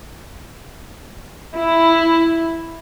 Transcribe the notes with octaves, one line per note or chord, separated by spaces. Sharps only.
E4